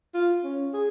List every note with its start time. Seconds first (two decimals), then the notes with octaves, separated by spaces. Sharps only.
0.14 F4
0.44 C#4
0.74 G#4